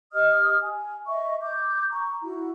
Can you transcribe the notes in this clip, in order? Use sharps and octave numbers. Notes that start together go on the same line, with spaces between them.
G4 D#5 D#6 F6
G#5
D#5 E5 C#6
D6 G6
A#5 C#6
E4 F#4